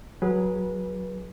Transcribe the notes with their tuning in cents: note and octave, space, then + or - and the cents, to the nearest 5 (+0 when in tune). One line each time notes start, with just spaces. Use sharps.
F#3 +0 G#4 +0 B4 -25